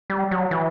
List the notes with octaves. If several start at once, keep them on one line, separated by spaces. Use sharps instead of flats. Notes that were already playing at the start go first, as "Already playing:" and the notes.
G3
F#3
E3